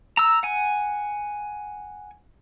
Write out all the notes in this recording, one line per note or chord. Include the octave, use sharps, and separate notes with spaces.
A#5 E6
F#5 G#5